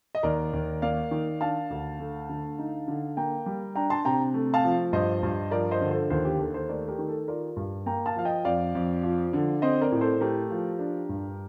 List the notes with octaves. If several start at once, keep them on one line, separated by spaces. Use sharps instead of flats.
D#5
D#2 A#4 D5
D#2
A#3 D5 F5
D#3
D4 F5 A5
D2
A3
D3
D#4
D3
A#3 G5 A#5
G3
D4 G5 A#5
A5 C6
C3 G5 A#5
A3
F5 A5
F3
G2 C5 D#5
G2
F3 A#4 D5
C5 D#5
D3
A4 C5
D#2 A4 C5
G4
D#2 A4
A4 C5
A3 A#4 D5
G4 A#4
D#3
A4
F4 A#4 D5
G2
A#3 G5 A#5
F5 A5
F3 F5
D#5 G5
F2 D5 F5
F2
F3
D3
C4 C5 D#5
A#4 D5
A2
A4 C5
A3 G4 A#4
F3
D4
G2